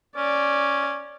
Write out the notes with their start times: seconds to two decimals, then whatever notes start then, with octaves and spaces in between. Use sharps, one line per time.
0.17 C#4 D5